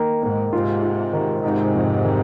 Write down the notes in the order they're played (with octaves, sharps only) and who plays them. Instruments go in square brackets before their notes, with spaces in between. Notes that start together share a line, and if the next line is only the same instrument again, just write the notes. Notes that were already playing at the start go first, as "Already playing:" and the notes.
Already playing: [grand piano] D#3 A#3
[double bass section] G#2 [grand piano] A#3
[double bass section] G#2 C3 [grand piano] F4
[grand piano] F4
D#3
[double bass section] G#2 C3 [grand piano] D#4
[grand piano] F2
D#3